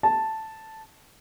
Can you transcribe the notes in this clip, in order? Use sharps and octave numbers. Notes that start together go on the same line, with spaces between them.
A5